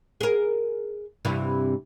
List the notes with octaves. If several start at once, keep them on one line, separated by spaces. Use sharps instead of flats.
G#4 A#4
G2 C3 E3